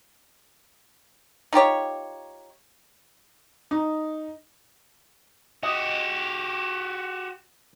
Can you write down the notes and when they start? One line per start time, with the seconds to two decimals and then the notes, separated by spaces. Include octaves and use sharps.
1.53 D#4 F4 G4 C#5
3.71 D#4
5.63 F#4 G4 D#5